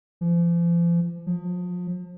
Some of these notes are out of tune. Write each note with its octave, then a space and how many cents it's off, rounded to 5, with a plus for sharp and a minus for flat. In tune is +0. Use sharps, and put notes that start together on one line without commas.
F3 -40
F3 +35